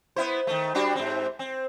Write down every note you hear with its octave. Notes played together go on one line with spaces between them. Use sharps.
B3 E4 C5
D#3 A3
G3 D4 F#4
G#2 C4
C4